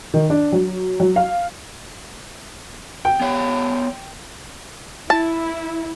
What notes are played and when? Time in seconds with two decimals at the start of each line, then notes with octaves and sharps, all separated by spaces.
0.14 D#3
0.30 D4
0.52 F#3
1.00 F#3
1.16 F5
3.05 G5
3.21 B3 C#5 F5
5.10 E4 A5